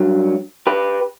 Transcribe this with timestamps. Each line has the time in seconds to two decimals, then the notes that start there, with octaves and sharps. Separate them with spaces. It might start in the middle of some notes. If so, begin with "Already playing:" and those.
Already playing: G2 F#3
0.67 G4 B4